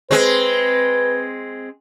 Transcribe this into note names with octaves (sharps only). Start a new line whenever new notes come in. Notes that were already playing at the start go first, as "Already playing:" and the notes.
G#3 C4 B4